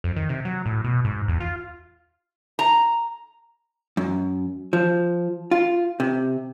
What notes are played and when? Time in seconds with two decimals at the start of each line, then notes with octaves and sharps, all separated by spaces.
0.04 F2
0.16 D#3
0.29 C3
0.45 F#3
0.66 A2
0.84 B2
1.05 G#2
1.28 E2
1.40 F4
2.59 A#5
3.97 F#2
4.73 F3
5.51 F4
6.00 C3